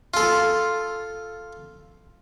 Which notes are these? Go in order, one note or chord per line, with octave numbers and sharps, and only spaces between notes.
F4 A4